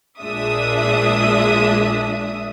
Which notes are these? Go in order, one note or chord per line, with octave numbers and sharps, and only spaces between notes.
A#1 A#2 G#3 D4 E5 D#6